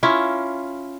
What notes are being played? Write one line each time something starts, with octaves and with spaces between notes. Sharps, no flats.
C#4 E4 F4